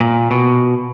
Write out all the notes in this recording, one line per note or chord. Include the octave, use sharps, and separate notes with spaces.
A#2
B2